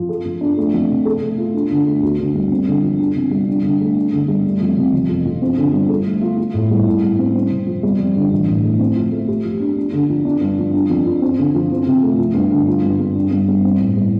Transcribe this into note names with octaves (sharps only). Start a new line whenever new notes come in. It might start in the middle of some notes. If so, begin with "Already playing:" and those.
Already playing: F3
A4
F3
D4
A3
F2
C3
A4
A3
F4
D4
D3
A3
D2
D3
G3
C4
D3
F3
D4
C3
G3
D4
D3
A3
D4
D3
G3
A3
F2
C3
F1
F2
F3
C4
D3
G3
A4
A3
F4
F4
A2
G3
A2
G3
C4
C4
C3
F3
G3
F2
D3
A1
A2
A3
C4
F3
A3
G4
F3
D4
D4
D3
F3
D4
G2
F3
D4
F2
F3
C4
D3
F3
C4
C3
A3
F3
G2
D3
F4
G2
G3
D4
G2
G3
C4
A2
G3